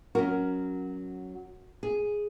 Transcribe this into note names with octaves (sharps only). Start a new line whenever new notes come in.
F#3 C#4 F#4 A#4
G#4